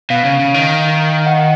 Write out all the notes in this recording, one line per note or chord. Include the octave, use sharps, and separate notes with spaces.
B2 F5
C#3
C#3
D#3
F#5